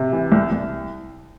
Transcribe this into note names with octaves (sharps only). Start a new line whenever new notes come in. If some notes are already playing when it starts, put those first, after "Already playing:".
Already playing: C3
E3
C2
C2